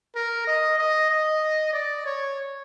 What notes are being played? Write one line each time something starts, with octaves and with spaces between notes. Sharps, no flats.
A#4
D#5
D#5
D#5
D5
C#5